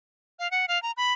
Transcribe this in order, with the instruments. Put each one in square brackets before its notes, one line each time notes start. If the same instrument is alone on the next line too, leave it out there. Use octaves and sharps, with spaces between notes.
[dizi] F5
F#5
F5
A#5
B5